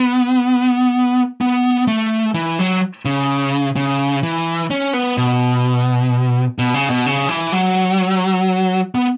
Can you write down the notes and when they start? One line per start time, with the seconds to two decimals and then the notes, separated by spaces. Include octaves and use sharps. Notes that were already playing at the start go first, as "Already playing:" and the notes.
Already playing: B3
1.41 B3
1.87 A3
2.34 E3
2.59 F#3
3.05 C#3
3.76 C#3
4.23 E3
4.70 C#4
4.93 B3
5.17 B2
6.59 B2
6.74 C#3
6.90 B2
7.06 C#3
7.29 E3
7.52 F#3
8.95 B3